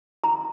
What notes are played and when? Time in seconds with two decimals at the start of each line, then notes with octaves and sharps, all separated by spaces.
0.24 A#5